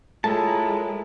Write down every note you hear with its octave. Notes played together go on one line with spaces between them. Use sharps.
G#3 A3 E4 F4 A#4 C#5 G5 A5